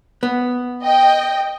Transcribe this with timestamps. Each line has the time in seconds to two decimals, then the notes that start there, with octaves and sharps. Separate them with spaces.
0.23 B3
0.84 D#5 G5